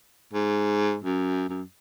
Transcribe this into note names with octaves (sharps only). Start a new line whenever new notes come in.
G#2
F#2
F#2